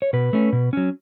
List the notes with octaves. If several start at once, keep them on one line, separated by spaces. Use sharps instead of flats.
C#5
B2 B4
A3 C#4
B2
F#3 C#4